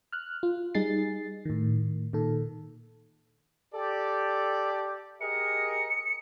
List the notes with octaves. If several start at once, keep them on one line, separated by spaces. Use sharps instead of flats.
F6 F#6
F4
G3 D#4 G#4 A6 C7
A2 D#3
A#2 D#3 A4
G4 A4 D5
G4 G#4 A#4 D#5 C#7